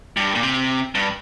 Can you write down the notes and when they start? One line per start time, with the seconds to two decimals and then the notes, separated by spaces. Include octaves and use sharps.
0.17 G2
0.35 A#2
0.43 C3
0.95 G2